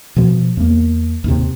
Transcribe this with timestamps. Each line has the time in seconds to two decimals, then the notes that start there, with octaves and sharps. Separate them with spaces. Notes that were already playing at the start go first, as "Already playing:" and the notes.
0.16 B2 F3
0.57 E2 A#3
1.24 D#2 G#2 C3